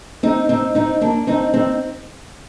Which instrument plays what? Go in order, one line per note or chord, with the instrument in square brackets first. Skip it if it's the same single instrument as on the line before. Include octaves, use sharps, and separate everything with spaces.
[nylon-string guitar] C4 D#4
C4 D#4
C4 D#4
A#3 D4
C4 D#4
C4 D#4